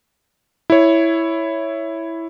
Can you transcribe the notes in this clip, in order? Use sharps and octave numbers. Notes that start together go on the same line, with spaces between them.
E4 C#5